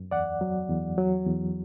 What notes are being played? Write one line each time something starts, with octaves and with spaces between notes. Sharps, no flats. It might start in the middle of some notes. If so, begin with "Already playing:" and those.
Already playing: F#2
E2 D5 F#5
F#3
E2
F#3
E2